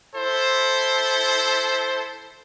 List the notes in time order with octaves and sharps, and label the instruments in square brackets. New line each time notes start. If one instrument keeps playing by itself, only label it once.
[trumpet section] E4 A4 C5